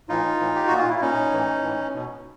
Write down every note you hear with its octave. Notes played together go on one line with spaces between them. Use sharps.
A2 E3 D#4 F4
A2 E3
G4
A#2 F#4
F4
E4
A#2 C#4 D#4
A2 E3
A2 E3
B2